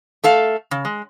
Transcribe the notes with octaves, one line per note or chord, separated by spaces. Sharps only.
A3 A4 F5
C#3
G#3